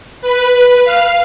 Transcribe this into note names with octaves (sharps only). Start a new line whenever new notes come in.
B4
F5